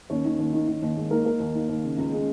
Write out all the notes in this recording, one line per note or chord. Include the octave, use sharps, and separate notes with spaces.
D#2 C#4
D#3
D#2
D#3
D#3
D#2
D#2 G#3 G#4
D#3 A#3 A#4
D#3 A#3 A#4
D#2
D#3
D#2
C#3
C#2
C#3 G#3 G#4